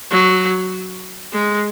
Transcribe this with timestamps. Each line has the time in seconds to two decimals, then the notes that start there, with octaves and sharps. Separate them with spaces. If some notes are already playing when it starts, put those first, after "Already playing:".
0.11 F#3
1.32 G#3